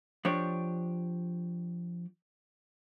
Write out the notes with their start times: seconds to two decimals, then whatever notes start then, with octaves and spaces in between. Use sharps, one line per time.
0.25 F3 D4 G4 C#5